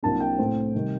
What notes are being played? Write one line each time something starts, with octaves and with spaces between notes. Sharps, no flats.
C2 C3 F#3 A#3 D4 A5
G5
A2 A3 C4
C3 D#3 G3